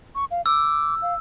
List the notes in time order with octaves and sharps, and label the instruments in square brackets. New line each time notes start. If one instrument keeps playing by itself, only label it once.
[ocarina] C#6
F5
[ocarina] D6 [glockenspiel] E6
[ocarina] F5